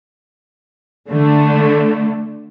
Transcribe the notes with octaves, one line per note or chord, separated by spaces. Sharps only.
D3 A3